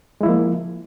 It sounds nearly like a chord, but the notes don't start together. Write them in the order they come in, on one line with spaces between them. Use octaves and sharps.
G#3 E4 F3 A#3